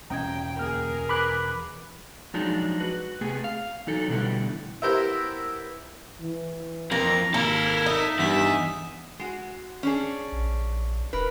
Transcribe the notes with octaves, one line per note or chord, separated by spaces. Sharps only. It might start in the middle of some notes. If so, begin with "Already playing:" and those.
E1 E2 C#4 G5 A#5 D#6 G#6
D2 A#3 G#4 A#4 F6
B4 B5 D6 F#6
F3 F#3 G#3 D4 D#4
F#4 B4
C3 A3 B3 G#4
F5
E3 F#3 D#4 A4
B2 D3 E3 G3 A3
B3 E4 G4 A#4 C5 E5
E3
F2 A#3 A#5
G#1 A#3 E4 A4 A#4
D#4 E5
E2 G2 E5
G#3 F#4
C#4 D4 G#4
A#1
E1 A#4 B4